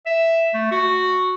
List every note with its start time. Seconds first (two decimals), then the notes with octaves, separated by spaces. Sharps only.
0.06 E5
0.54 A3
0.71 F#4